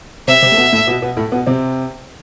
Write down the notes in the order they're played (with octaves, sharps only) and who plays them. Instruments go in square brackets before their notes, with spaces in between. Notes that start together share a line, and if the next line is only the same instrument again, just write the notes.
[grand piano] C3 C4 [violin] E5
[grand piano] C3 C4
A3
B2 B3
A2 A3
B2 B3
B2 B3
A2 A3
B2 B3
C3 C4